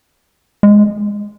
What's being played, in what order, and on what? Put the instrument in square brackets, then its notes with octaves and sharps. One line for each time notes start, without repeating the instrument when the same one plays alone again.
[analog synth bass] G#3